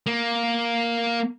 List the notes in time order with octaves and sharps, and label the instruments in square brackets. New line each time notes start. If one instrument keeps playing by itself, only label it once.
[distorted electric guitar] A#3